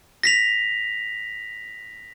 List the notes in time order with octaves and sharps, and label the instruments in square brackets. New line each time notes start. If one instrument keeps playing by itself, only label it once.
[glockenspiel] A#6 B6 F7